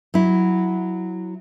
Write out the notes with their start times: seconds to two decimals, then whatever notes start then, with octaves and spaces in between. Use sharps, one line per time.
0.14 F#3 E4